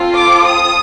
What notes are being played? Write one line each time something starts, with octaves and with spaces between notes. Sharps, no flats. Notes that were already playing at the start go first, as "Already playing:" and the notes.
Already playing: C4 F4 A4
D6
D#6